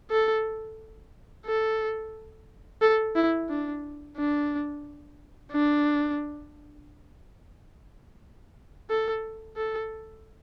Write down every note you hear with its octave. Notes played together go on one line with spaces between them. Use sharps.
A4
A4
A4
E4
D4
D4
D4
A4
A4